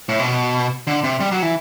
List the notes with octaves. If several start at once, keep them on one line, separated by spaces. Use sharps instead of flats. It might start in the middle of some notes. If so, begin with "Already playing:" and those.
A2
B2
D3
C3
G3
F#3
E3